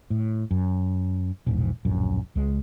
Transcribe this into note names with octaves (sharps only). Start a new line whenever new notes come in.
A2
F#2
E1 A#1 G#2
D1 A#1 F#2
C#2 G#3